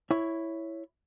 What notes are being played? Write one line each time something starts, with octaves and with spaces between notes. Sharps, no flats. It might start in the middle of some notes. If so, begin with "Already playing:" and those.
E4 C#5